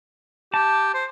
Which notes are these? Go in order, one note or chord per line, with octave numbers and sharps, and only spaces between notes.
G4 A5
C5